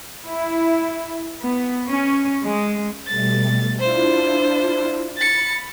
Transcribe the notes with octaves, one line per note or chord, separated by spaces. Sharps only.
E4
B3
C#4
G#3
B2 G3 A3 A6
D4 E4 F4 C5
B5 A6 C#7